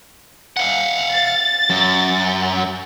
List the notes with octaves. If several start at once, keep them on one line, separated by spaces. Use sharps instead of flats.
F5 F#5
A6
F#2